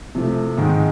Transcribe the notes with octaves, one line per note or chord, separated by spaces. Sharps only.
C3 F3 A3
G#2 D#3 G#3